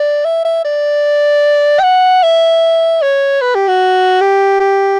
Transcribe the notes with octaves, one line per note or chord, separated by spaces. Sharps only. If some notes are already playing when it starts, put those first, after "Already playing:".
Already playing: D5
E5
E5
D5
G5
F#5
E5
C#5
B4
G4
F#4
G4
G4